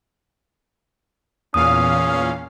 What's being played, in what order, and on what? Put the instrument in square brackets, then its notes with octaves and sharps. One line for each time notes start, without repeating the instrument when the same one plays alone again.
[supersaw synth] E2 A#2 F5 [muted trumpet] C#4 [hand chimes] D#6